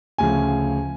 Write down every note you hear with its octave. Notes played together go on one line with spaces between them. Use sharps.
D2 C#3 F3 G#5